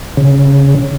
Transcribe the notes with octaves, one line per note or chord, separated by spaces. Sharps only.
C#3